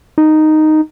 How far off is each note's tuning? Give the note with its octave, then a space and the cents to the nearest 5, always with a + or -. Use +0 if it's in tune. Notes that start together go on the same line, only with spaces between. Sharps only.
D#4 -5